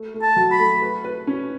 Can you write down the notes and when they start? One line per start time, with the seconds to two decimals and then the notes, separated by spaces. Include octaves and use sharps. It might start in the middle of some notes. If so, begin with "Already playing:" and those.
Already playing: A3
0.14 A3
0.22 A5
0.36 F#3
0.51 B5
0.59 A3
0.82 B4
1.04 B4
1.27 C#4